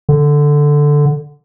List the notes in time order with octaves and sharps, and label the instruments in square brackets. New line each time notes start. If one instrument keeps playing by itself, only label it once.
[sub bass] D3